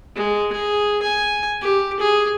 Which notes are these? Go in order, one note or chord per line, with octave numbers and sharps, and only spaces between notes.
G#3
G#4
G#5
G4
G#4